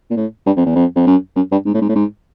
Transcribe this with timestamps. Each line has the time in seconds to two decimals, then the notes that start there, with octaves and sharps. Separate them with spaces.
0.10 A#2
0.17 A2
0.46 G2
0.57 F2
0.66 E2
0.76 F2
0.96 F2
1.07 F#2
1.36 F#2
1.52 G2
1.66 G#2
1.74 A2
1.82 G#2
1.89 A2
1.96 G#2